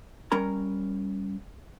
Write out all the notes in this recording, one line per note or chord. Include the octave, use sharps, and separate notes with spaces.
G3 C#4 A#4 A#5